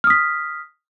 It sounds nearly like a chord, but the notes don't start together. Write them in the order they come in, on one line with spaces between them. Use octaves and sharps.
F6 D#6 B6